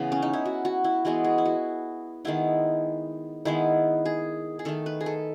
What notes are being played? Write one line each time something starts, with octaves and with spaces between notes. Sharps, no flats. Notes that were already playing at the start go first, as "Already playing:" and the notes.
Already playing: C#3 E3 B3
C#4
D#4
E4
F#4
F#4
E4
E3 G#3 B3 F#4
G#4
E4
F#4
D#3 G#3 B3 E4
D#3 G#3 B3 E4
G#4
G#4
D#3 A3 A4
B4
G#4
A4